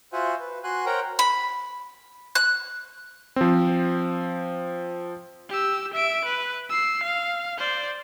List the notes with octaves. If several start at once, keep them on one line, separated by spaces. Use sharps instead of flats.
F4 F#4 C5 E5 F#5 G#5
B4
F#4 G#5 C6 F#6
A#4 C5 C#5 F#5 G5 A#5
B5
F#6
F3 C4
G4 E6
E5 D7
B4
E6 C7
F5
C5 D5